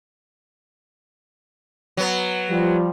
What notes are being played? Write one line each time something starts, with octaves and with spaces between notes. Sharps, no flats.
F#3 B3
F3 G3